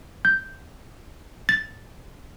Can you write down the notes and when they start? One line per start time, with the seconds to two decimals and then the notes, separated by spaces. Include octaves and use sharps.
0.25 G6
1.49 A6